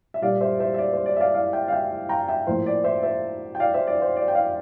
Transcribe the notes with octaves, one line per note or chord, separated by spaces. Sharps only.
E5
A#2 G3 A#3 D5 F5
C5 E5
C5 E5
E5
D5
C5
D5
E5
D5 F5
D5 F5
E5 G5
F5
E5 G5
G5 A#5
E5 G5
A2 F3 A#3 C5
D5
C5 E5
C5 E5
G5
D5 F5
C5 E5
D5
C5
D5
G5
D5 F5